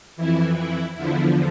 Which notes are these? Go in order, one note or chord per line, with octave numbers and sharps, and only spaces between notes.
F2 E3 E4
E4
E2 D3 F3 E4